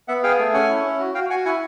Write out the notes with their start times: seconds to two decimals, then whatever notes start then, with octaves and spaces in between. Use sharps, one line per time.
0.08 B3 E5 F#5
0.23 G#4 F5 G5
0.39 A3
0.54 C#4 F#5 G#5
0.69 E4
0.84 C#4
0.99 F#4
1.15 F#4 F5 G5
1.30 F#4 F#5 G#5
1.45 E4 F#5 G#5